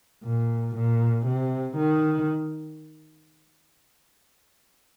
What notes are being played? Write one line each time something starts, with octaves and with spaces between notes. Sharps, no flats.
A#2
A#2
C3
D#3